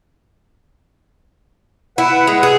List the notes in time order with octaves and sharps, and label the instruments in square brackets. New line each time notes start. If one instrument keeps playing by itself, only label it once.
[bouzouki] E4 [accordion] B4 F#5
[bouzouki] G#3
G#4